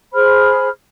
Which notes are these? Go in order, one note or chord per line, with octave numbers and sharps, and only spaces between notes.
G#4 C5 B5 F6